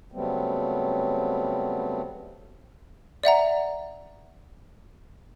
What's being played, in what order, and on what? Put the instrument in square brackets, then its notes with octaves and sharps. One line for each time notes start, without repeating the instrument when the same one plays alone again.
[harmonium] C#3 F#3 G3 A3 B3 C4
[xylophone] D5 E5 F#5 A#5